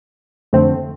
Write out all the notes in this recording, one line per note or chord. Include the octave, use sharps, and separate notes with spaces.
F2 D3 A3 C4